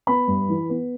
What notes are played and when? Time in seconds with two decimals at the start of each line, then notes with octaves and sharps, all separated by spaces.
0.07 B3 B5
0.28 G2
0.49 E3
0.69 B3